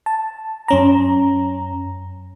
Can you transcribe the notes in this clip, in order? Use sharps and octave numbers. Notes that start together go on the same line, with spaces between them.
A5
F#2 C#4 A#5